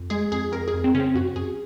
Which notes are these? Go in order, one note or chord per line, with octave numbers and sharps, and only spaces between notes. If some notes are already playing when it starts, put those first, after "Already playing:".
Already playing: F2
G#3 G#4
F2 G#4
F2 A#4
G#4
F2
C4
C#3 C#4
C4
F#2 F#4
F#2 G#4